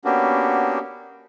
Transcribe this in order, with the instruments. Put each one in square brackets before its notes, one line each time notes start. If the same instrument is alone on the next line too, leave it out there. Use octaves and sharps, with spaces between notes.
[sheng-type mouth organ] A#3 B3 C#4 D4 F#4 G4